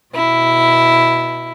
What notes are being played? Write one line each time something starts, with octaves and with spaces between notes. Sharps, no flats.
B2 E4